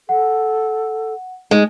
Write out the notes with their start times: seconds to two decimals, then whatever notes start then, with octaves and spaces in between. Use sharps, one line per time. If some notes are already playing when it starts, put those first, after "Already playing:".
0.09 A4 F#5
1.51 G#3 D#4